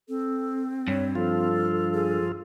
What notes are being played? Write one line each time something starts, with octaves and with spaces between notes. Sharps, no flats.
C4 A4
G2 C#5
F3 F4 A4
G#4